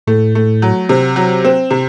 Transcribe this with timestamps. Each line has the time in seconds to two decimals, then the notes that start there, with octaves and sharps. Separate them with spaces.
0.07 A2 A3
0.35 A3
0.62 F#3
0.89 C3
1.16 F#3
1.45 C4
1.71 C3